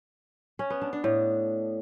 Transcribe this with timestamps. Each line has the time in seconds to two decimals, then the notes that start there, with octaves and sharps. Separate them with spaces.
0.59 C#4
0.70 B3
0.82 D4
0.93 D4
1.04 A2